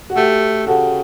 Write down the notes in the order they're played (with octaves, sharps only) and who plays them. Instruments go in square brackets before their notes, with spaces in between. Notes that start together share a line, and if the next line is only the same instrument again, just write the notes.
[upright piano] F#4
[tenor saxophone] A3 [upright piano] G4
[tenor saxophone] C#3 [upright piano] F#4 A4